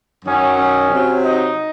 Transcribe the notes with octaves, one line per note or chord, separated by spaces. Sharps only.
F#2 D#3 F#3 C#4
C#4
C3 F#3
D#4